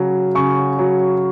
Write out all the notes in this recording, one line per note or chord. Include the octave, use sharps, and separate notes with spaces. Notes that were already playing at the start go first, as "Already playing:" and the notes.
Already playing: C#3 F#3
C#3 C#6
F#3